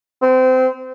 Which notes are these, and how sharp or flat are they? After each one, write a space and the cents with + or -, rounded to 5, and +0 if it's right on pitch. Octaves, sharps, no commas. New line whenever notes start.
C4 -25